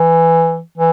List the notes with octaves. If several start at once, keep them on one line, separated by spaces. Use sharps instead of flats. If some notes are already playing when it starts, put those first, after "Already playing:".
Already playing: E3
E3